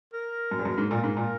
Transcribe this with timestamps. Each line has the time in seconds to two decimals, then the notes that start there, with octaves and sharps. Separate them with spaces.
0.13 A#4
0.51 F#2
0.59 E2
0.65 F#2
0.78 G#2
0.90 A#2 A#4
1.04 G#2
1.17 A#2